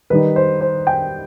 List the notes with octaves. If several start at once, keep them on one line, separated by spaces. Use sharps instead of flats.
D#3 G3 D#4 B4
C5
C5
G5